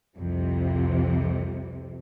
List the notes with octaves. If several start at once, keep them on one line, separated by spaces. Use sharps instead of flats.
C2 F2 C3